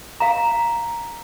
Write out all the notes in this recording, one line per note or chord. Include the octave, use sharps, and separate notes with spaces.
F5 A#5